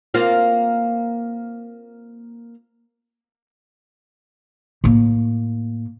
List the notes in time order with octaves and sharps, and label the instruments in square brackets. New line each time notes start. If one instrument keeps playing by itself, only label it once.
[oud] A#3 C4 F4
[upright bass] A2 A#3